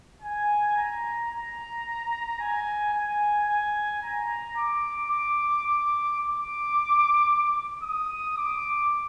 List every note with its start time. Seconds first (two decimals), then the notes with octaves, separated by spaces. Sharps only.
0.22 G#5
0.76 A#5
1.31 A#5
2.40 G#5
2.94 G#5
3.49 G#5
4.03 A#5
4.57 D6
5.11 D6
5.66 D6
6.20 D6
7.83 D#6
8.37 D6